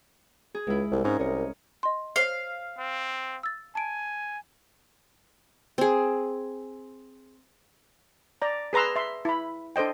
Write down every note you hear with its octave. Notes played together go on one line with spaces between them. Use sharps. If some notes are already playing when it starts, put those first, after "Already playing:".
G#4
C#2 G#3 E4
C2
G#2 C4 C#4 A#4
C2 C#5 D#5
D#5 C6
C5 C#5 F5 G7
C4
E6 A6
G#5 A5 D7
C4 G#4
D5 A#5
G#4 B4 A#5 C6 E6
E5 C6
E4 B5
D4 A4 C5 D#5 G5